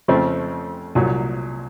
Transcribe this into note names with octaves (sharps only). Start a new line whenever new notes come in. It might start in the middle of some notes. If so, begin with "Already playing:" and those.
F2 C#3 F3 A3 C4
C2 A#2 F#3